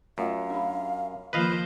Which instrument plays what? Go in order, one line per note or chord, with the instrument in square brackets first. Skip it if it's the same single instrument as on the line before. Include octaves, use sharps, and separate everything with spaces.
[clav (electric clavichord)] F#2 [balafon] A3 F4 D#5 [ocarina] F5
[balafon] D4 G4 B5
[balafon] D#3 F4 [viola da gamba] F3 A#3 C5 [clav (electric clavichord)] B4 D#5 F5